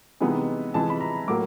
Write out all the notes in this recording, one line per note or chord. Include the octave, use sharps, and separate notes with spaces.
C3 E3 G#3 B3 D#4
C3 E3 G#3 A5
B5
A#5
A2 F#3 A#3 D6